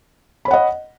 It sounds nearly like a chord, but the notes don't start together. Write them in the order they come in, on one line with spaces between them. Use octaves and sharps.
B5 C#5 F#5 D#5